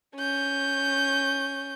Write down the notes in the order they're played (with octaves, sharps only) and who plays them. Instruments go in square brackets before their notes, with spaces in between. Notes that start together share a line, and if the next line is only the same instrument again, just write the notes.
[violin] C#4 G6